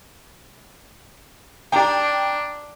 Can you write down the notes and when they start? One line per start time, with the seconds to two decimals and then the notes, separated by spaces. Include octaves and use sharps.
1.72 D4 G5 A#5